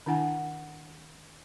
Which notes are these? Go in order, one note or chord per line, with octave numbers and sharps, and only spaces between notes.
D#3 D4 E4 F#5 G#5